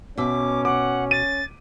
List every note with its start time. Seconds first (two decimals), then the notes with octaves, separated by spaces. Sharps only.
0.18 B2 C#4 E5 D6
0.65 F#5 D6
1.11 A6 D#7